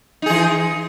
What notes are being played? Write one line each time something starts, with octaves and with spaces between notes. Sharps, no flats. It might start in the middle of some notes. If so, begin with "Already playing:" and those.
E3 D#4 G#4